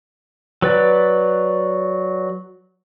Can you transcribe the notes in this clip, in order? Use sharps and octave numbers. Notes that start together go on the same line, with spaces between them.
F#3 B4 D5